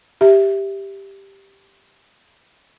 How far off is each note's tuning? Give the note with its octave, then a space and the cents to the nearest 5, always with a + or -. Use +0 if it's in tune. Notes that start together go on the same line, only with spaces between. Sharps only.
G4 +0 E5 +0